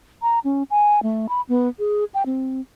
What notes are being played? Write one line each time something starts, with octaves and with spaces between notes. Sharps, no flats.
A#5
C#4
G#5
A3
B5
B3
G#4
G5
C4